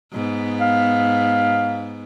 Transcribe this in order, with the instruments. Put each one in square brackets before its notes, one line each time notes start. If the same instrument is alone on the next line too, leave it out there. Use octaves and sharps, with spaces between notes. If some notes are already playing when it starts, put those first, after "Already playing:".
[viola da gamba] G#2 B3
[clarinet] F5